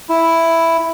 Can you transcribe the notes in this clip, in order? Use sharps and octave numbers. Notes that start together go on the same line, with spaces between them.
E4